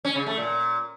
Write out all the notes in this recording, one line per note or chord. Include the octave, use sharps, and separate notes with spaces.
C#4
C#3
A3
A#2